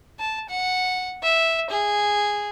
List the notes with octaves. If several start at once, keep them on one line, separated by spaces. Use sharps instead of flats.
A5
F#5
E5
G#4